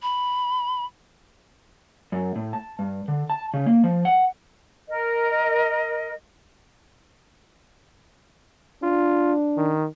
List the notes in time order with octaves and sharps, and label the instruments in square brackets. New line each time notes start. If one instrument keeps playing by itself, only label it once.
[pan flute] B5
[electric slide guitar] F#2
A2
A5
G2
D3
A5
C#3
A#3
F3
F#5
[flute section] A#4 D#5
[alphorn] D4 [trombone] F4
[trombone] D#3